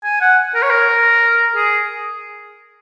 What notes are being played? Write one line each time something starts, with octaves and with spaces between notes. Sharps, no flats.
G#5
F#5
A#4
C#5
A#4
G#4